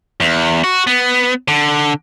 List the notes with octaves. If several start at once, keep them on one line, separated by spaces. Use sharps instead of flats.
E2
F#4
B3
D3